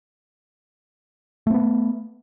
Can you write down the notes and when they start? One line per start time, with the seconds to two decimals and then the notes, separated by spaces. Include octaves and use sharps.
1.47 A3
1.50 C4
1.54 B3